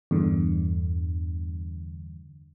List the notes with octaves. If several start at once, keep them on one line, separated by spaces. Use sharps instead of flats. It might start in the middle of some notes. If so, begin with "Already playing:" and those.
E2 G2 D3